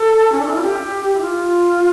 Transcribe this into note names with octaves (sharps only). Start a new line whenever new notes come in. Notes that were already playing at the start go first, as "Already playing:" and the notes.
Already playing: A4
C#4
D4
E4
F4
G4
E4
F4